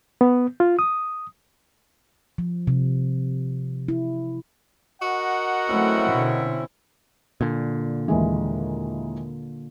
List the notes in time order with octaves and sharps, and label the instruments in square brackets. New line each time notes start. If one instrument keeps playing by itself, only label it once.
[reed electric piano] B3
F4
D#6
[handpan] F3
C3
E4
[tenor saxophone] F#4 [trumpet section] A#4 D#5 F#5
[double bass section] F#3 A3 [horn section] C4 C#4 E4
[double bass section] B2 D3
[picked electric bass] A#2 D3
[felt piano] D#2 E3 G#3